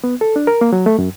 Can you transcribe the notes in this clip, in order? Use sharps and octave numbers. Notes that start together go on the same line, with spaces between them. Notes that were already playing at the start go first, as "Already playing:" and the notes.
B3
A4
D4
A#4
A#3
F#3
A3
F#2